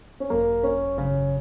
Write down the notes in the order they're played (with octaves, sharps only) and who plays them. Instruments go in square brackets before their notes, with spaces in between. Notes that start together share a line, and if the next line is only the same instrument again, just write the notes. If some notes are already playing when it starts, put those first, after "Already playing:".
[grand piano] C#4
[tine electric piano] G#1 F#2 F#3 [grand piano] A#3
[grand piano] C#4
[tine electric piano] G#1 F#2 F#3 [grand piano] C#3